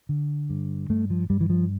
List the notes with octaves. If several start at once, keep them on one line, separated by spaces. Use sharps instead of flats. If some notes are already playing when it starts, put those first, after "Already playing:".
D3
G2
G2 A3
F3
G2 G3
E3
F3